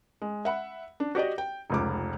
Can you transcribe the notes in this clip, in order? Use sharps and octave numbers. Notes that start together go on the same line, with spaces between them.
G#3
E5 F#5 B5
D4
F#4 G4 D5 D#5
G5
F1 C#2 D6